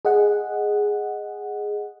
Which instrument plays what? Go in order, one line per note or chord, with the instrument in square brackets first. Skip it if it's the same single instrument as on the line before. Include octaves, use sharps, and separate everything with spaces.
[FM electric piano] G#4 D#5 F#5